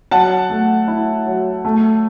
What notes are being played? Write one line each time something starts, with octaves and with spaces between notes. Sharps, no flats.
F#3 F#5 A5
A3
E4
F#3
A3